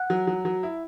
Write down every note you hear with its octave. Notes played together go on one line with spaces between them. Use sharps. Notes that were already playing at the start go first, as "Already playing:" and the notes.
Already playing: F#5 F#6
F#3
F#3
F#3
E4